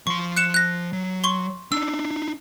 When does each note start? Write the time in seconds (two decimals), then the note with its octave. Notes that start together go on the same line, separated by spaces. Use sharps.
0.07 F3 C6 C#6
0.37 F#6 C#7 E7
0.54 F#6 A#6
0.93 F#3
1.24 C6 C#6 G7
1.72 D4 D#4 E6